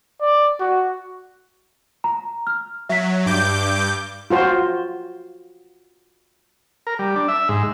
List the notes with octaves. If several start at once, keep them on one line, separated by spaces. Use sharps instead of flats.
D5
F#4
A#5
F6
F#3 E5 B6
G2 D6 G6
F4 F#4 C5
A#4
G3
D4
E5
G#2